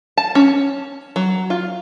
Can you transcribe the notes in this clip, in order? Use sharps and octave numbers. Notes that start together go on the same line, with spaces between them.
A5
C#4
F#3
F4